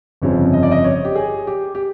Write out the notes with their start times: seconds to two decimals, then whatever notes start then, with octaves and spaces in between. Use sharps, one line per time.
0.22 G1 F2 C#3 F3 C#5
0.53 D#5
0.63 D5
0.71 D#5
0.84 C#5
1.05 G4
1.16 G#4
1.47 G4
1.75 G4